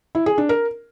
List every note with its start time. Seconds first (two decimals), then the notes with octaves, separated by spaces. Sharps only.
0.15 E4
0.26 G#4
0.38 D4
0.49 A#4